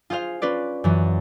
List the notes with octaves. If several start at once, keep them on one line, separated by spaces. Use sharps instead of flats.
F4 G#4 C5 F5
C#4 F4 B4 D5
F#2 E3